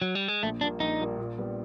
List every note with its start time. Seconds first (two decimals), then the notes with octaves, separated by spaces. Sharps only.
0.02 F#3
0.15 G3
0.28 G#3
0.43 A#1 A3
0.61 A#2 G3 A#3 D4
0.80 A#1 D#4
1.00 A#2 G3 A#3
1.18 A#2
1.37 G3 B3